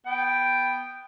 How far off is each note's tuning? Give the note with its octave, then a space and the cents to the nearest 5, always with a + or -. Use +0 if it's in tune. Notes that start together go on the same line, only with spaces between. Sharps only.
B3 +0 G5 +0